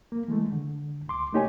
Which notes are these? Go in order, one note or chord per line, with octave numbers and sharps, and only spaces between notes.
A#3
E3 G#3 A3
D3
D2 C6 D6
A3 A#3 D#4 G4 C#5 G#5